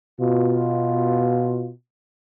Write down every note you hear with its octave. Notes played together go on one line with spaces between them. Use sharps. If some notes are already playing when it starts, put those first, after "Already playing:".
B2 F4